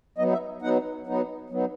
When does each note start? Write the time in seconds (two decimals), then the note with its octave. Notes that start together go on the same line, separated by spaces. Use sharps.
0.18 F#3 B3 D#4 D#5
0.32 E5
0.62 F#3 B3 D#4 F#5
1.07 F#3 B3 D#4
1.50 F#3 B3 D#4